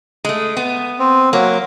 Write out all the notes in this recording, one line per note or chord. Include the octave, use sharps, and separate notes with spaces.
G#3 A3
B3
C4
F#3 A#3